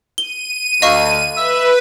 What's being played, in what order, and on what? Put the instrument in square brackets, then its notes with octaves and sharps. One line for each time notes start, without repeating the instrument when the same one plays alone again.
[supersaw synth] D#7 [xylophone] G7
[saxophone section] D2 [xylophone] D#5 F5 C#6
[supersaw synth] B4 [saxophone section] E5